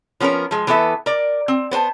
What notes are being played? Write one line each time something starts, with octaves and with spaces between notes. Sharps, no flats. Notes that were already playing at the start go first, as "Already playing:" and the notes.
F3 B3 C#4 A4 A#4
F3 G#3
E3 B3 A4 C5 E5
A#4 D5
C4
B3 C5 G#5 A5